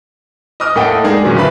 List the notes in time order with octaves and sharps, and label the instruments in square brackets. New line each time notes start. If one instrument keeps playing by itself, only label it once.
[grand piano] D#5 D6 D#6 F6
A2 A#3 A4 D#5 F#5 G5
G#3 D4 D#4 G#4 A#4
F#2 A#2 D#3 F#3 A#3
D2 E4 F4 B4 B5